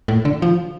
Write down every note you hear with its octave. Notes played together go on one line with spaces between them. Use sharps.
A2
D3
F3